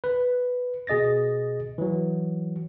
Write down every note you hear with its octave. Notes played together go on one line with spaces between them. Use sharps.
B4
B2 G#4 D#5 A6 A#6
E3 F#3